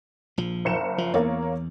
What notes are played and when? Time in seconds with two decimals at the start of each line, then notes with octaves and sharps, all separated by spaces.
0.38 A#1 F3
0.65 F#1 C#7 E7
0.98 F3
1.14 E2 A#3 C#5